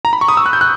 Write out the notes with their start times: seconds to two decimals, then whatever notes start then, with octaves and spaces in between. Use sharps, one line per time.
0.05 A#5
0.13 B5
0.21 C#6
0.28 D#6
0.37 E6
0.46 F#6
0.53 G6
0.61 F#6